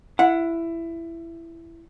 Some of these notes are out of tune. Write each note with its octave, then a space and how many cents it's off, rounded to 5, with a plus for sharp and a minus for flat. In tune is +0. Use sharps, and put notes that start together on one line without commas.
E4 +15 F#5 -15